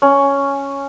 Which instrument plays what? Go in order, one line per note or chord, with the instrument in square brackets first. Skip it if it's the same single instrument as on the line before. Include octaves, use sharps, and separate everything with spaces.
[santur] C#4